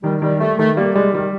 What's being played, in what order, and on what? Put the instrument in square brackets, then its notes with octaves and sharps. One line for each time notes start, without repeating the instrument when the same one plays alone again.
[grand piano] D#3 [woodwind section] G3
[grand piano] D#3 [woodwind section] G3
[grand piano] G3 [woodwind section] A3
[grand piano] D#3 [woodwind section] A3
[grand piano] G3 [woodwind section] A#3
[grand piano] G3 [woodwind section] G#3
[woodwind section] D#3 [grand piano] G3